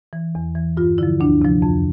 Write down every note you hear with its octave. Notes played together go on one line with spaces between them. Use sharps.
E3
E2
E3
G2 F4
D3 F3 E4
D2 D4
C3 F3
F2